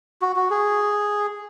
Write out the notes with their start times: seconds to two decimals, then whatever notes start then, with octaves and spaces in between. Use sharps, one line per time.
0.22 F#4
0.36 F#4
0.51 G#4